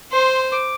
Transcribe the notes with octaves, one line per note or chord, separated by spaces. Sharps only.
C5 C6
D6